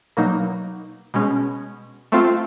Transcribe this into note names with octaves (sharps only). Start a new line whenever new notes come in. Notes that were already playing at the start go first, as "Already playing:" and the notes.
B2 F#3 A#3 D#4
B2 G#3 C#4
A3 C4 F4